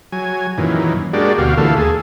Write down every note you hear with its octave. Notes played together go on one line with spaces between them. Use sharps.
F#3 G#5
F#2 A#2 D#3 E3
G#3 A#3 D4 F#4 G4 D5
D2 B2 F#4 G4 F5
A#2 D3 E3 A3 A4 F5
D#2 G#4 A4